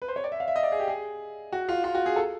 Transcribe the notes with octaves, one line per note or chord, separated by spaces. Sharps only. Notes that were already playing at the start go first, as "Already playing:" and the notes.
B4
C5
C#5
D5
E5
F5
E5
D#5
D5
G#4
G4
G#4
F#4
F4
F4
F#4
G#4
A4